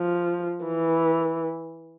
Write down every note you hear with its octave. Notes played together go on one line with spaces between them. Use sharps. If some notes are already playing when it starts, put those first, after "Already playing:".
Already playing: F3
E3